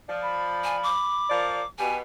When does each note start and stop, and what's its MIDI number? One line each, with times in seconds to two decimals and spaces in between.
0.08 0.90 53
0.08 0.90 74
0.22 1.37 83
0.64 0.77 80
0.83 1.67 86
1.30 1.61 53
1.30 1.61 70
1.30 1.61 74
1.79 2.00 47
1.79 2.00 67
1.79 1.96 80